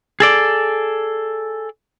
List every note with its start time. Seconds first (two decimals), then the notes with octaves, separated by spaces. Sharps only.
0.20 G#4 A4 D5